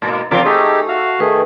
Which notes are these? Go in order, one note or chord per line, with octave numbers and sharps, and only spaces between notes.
G#2 B2 A#3
C3 F3 C4 F4 A#4 D6
A3 D#4 G4 G#4
F#4 F5
D#3 A3 G#4 B4